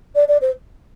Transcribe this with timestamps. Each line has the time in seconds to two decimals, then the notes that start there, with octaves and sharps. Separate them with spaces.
0.15 D5
0.28 D5
0.41 C5